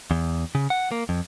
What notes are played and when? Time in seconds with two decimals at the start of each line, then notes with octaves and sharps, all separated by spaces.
0.11 E2
0.55 C#3
0.70 F#5
0.92 A#3
1.09 F2